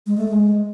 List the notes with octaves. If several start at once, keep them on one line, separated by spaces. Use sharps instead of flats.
G#3
A3
G#3